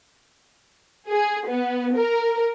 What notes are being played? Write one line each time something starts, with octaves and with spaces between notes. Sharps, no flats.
G#4
B3
A#4